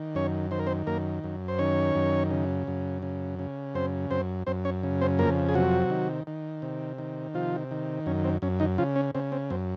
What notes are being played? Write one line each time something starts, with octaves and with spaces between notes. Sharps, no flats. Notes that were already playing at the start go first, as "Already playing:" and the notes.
Already playing: D#3
F#2 C#4 C#5
D#3 C5
A#4
C4 C5
F#2 A#3 A#4
F#2
C5
D#3 C#4 C#5
F#2
C#3
F#2
C#3
C#3
F#2 C4 C5
F#2 C4 C5
F#2 C4 C5
C#4 C#5
C#3
C4 C5
F2 A#3 A#4
G#4
C3 F#3 F#4
D#3
D#3
C3
D#3
C3 F3 F4
D#3
F#2 C#4
C4
F#2 C#4
D#3 D#4
C#3 F3 F4
C#4
C#3 C4
C4
F#2 C4